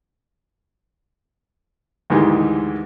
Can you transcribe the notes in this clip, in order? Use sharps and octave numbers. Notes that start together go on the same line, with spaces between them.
D2 G#2 D#3 E3 G#3 G4